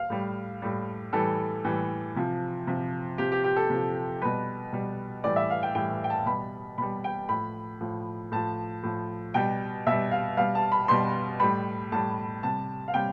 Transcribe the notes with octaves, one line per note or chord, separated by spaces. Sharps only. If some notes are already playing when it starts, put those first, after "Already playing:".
Already playing: F5
A2 G3
A2 G3
A2 E3 G3 A4
A2 E3 G3
C3 F3
C3 F3
C3 F3 G4
G4
G4
A4
C3 F3
B2 G3 B4
B2 G3
A2 E3 G3 D5
E5
F5
G5
A2 E3 G3 G5
G5
A5
B2 G3 B5
B2 G3 B5
G5
A2 F3 B5
A2 F3
A2 F3 A5
A2 F3
B2 G3 G5
B2 G3 E5
F5
B2 G3 F5
A5
B5
B2 G3 C6
A2 G3 B5
A2 G3 A5
C3 G3 A5
F5
C3 G3 G5